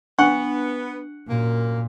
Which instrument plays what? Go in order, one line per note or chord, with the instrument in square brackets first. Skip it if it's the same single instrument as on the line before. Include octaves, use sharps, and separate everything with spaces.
[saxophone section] B3 [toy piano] D4 C#6 [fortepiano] F#5
[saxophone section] F#2 A#3 [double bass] A#2